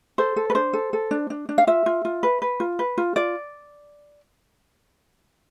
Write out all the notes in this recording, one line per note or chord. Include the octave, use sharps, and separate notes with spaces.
A4 C5
A4
B4
D4 C5
A4
A4
D4
D4
D4
F5
F4 E5
F4
F4
B4
B4
F4
B4
F4
F4 D5